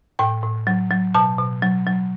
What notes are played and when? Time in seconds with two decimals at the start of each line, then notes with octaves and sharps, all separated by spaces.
0.19 A2 G5
0.43 A2
0.67 F#3
0.91 F#3
1.15 B2 A5
1.39 B2
1.62 F#3
1.87 F#3